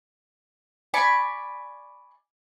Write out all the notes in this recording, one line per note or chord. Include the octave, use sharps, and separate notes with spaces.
D5 G#5 B5 C#6